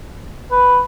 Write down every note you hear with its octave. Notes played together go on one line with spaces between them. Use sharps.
B4